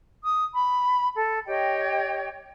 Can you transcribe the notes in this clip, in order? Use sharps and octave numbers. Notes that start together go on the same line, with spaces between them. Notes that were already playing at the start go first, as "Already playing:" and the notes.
D#6
B5
A4
G4 C#5 D#5 G5